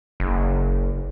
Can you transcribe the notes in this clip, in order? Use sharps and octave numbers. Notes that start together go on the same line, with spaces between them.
F#1